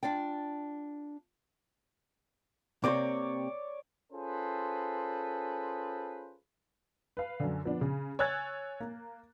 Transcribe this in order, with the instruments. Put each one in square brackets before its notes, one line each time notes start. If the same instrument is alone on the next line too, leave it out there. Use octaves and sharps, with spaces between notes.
[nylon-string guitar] D4 F4 D5 G5
[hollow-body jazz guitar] C3 A#3 C4 [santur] C#5 D5
[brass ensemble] C#4 F4 G#4 A4 B4 C5
[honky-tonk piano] B4 F5
F#2 D3
F3 B3 D4
C#3
C#5 G#5 E6 F#6 G#6 A6
A#3